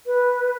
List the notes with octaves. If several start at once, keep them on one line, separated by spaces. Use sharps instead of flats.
B4